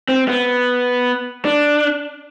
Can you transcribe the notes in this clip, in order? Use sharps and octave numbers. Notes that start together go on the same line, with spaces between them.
C4
B3
D4